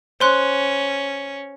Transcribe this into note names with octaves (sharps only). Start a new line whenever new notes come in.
C#4 C5 C6 F#6